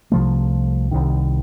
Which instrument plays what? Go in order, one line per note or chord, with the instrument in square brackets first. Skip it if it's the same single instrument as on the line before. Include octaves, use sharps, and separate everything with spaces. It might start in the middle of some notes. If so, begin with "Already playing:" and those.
[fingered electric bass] C2 C3 F3 A3
C2 C3 D#3